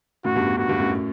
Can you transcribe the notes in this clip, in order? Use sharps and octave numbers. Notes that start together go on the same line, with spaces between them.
F#2 A2 F#4
E2 G2
E2
F#2 F#4
E2 G2
F#2 A2